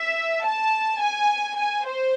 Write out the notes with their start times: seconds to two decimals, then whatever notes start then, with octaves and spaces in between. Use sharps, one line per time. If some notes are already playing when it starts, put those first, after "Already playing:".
Already playing: E5
0.45 A5
1.00 G#5
1.57 G#5
1.85 C5